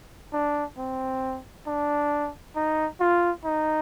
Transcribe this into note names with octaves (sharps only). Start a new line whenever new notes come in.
D4
C4
D4
D#4
F4
D#4